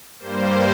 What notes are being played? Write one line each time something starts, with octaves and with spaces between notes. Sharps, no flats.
G2 G3 A#3 C5